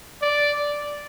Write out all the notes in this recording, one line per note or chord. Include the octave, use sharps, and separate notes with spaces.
D5